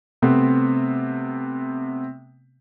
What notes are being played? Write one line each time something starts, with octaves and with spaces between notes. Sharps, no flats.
C3 A3 B3 C4